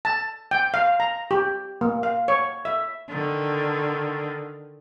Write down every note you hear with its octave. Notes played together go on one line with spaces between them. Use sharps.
A5
G5
F5
A#5
G4
A#3
F5
C#5
E5
D3 D#3